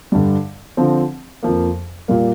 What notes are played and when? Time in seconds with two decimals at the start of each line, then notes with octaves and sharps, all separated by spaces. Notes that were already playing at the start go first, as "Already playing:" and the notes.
0.12 G2 D3 G3
0.77 D3 F3 C4
1.43 F2 F3 A#3
2.08 A#2 G3 A#3